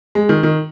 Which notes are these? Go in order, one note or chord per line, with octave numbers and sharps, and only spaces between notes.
G#3
D#3
D#3